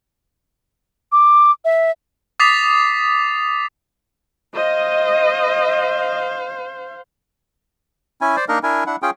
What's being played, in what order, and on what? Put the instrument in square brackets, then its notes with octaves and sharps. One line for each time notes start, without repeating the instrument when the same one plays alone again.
[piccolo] D6
E5
[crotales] D6 D#6 A6 B6 C7 F7
[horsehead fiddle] C5 F5 [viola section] D#5
[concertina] C#4 E4 G#5
C5 D5
A#3 D4 D#4 A#4 D#5
D4 E4 A#4 G#5
D4 E4 F#5
C#4 F4 G#4 G5